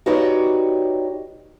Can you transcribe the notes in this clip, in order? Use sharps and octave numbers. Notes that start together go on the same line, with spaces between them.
D#4 F#4 G4 B4 C#5 D5